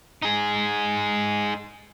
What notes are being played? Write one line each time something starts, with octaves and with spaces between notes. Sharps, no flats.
D#4 G#4